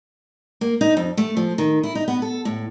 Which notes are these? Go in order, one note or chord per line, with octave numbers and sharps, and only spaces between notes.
A#3
D#4
F2
A3
F3
D#3
E4
D#4
B3
A4
A2